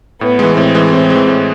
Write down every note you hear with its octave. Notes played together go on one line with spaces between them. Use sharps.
A2 B3
E3 G#3
A2 C4
E3 G#3
A2 C4
E3 G#3
A2